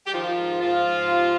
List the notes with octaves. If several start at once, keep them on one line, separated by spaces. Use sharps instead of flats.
G4
D#3 F3 F4
G#2
G#2 F3 F4
G#2
C3